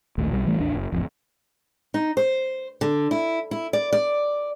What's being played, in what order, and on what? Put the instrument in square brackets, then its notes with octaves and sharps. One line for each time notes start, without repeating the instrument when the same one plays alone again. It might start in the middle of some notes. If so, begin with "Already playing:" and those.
[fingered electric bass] D1 A#1 D#2 A3
B1 G3
A1 E3 G3 A3
A1 D#2 D4
F#1
D1 A1 F2
[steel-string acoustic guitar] D#4
C5
D3
E4
E4
D5
D5